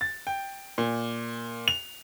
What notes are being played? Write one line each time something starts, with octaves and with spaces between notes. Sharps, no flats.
A6
G5
A#2
F7